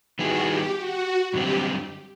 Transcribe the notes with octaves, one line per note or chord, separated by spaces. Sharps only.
D#3 G3 B3 E4 F#4 G#4
G4
F#4
F#2 D3 G3 C4 G4